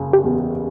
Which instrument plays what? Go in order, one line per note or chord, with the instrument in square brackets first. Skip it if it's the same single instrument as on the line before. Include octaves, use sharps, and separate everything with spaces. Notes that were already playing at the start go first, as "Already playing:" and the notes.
Already playing: [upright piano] F#1 C#3
[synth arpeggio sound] G4
[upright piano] E2